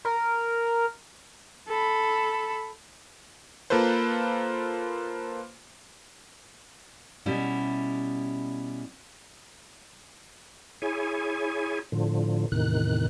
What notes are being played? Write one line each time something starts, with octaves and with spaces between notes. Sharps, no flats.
A#4
A4 B5
A#3 F4 A4 B4 C5
B2 G3 C#4 E4
E4 G#4 C#5 G#5
A2 D3 F3
E2 A2 C3 D#3 F#6